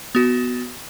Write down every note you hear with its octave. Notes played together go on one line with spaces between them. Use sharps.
B3 F#4